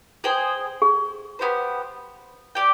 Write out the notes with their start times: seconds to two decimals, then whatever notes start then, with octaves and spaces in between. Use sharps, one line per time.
0.24 G#4 C5 G5
0.82 G#4
1.39 B3 D#4 G4 C5
2.55 G4 D5 G5